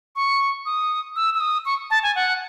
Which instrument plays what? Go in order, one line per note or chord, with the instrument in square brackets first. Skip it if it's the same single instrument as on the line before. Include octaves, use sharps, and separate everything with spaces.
[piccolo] C#6
D#6
E6
E6
D#6
C#6
A5
G#5
F#5